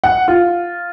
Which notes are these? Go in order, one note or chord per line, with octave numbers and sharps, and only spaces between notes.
F#5
F4